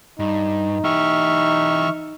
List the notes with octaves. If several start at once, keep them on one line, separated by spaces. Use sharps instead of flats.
G2 D#4
E3 G4 E5 C#6 F6